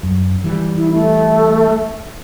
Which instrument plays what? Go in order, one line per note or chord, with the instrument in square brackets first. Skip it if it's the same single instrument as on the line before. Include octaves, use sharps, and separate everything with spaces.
[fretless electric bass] F#2
E3 G3
[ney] E4
A3